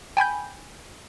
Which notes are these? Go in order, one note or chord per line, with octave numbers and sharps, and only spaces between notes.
G5 G#5 B5 G6